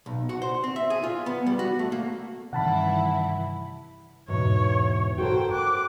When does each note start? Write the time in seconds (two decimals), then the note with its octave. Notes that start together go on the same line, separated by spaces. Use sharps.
0.06 B1
0.29 F#4
0.42 C5
0.64 C4
0.76 E5
0.90 G#4
1.04 F4
1.26 B3
1.46 G3
1.59 F#4
1.79 A3
1.92 A#3
2.53 G2 C3 D#3 E3 E4 F#5 A5 B5
4.28 E2 G#2 B2 C#5
5.18 F#4 A4 A#4 C5 G5
5.51 D6 F#6